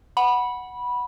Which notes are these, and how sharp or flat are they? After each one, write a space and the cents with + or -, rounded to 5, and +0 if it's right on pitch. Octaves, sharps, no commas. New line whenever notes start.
F#5 +0 B5 -15